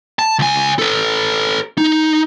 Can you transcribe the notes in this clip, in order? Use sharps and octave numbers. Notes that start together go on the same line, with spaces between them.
A5
C#2 G#5
A4 B4
D#4